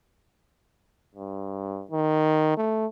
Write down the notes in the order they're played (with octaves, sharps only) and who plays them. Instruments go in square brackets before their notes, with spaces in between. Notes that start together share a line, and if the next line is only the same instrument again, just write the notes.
[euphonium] G2
D#3
A3